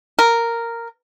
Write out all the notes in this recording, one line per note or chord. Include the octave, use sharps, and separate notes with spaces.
A#4